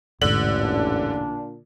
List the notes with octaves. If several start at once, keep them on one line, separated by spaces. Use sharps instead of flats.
E1 A1 G#2 D3 F#7
A#2 D4